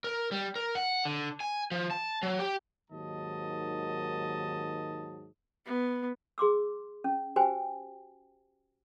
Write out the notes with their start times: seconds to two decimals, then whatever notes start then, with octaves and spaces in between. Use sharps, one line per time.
0.04 A#4
0.32 G3
0.56 A#4
0.75 F#5
1.05 D3
1.40 G#5
1.71 F3
1.91 A5
2.23 F#3
2.39 G4
2.91 D#2 G#2 D#3 F#3 D#5 A5
5.66 B3
6.38 G#4 C6 D6 E6
7.04 C#4
7.36 F#4 G4 B4 C5 G5 G#5